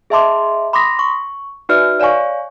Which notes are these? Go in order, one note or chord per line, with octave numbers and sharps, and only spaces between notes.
G#4 D#5 E5 A5 C6 D6
B5 C6 D6 D#6 A#6 B6
C#6
D#4 F#4 B4 D5 E5 F6
C#5 D5 F5 G#5 C#6